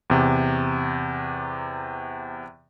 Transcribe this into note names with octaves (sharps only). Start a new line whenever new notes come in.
E2 C3